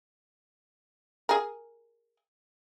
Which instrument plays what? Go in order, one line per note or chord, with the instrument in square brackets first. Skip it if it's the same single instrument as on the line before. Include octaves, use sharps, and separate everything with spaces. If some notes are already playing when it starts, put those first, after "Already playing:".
[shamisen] G#4 A#4